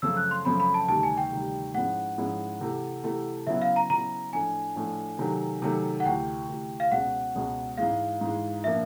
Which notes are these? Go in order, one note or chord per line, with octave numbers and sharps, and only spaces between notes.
F#2 C#3 F3 A3 C4 E6
F#6
C6
F#2 C#3 F3 A3 C4 B5
B5
A5
D2 C3 D#3 G3 A5
G#5
G5
D2 C3 D#3 G3
G#2 F3 G#3 C#4 E4 F#5
G#2 F3 G#3 C#4 E4
C3 E3 A3
C3 E3 A3
C#3 F#3 B3 E4 E5
F5
A#5
C#3 F#3 B3 E4 A#5
A2 F3 A3 D4 G#5
A2 F3 A3 D4
C3 D#3 F#3 A3
C3 D#3 F#3 A3
F#5
D2 C3 E3 G5
D2 C3 E3
F5
C#2 B2 G#3 C#4 F#5
C#2 B2 G#3 C#4
G#2 E3 G#3 F5
G#2 E3 G#3
A#2 F3 A#3 D4 E5